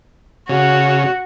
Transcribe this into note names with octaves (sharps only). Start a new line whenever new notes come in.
C#3 F#4